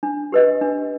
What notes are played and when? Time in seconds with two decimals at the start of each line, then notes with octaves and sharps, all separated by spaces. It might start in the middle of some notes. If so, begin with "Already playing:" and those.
0.03 D4
0.32 G4 B4 D#5
0.61 D4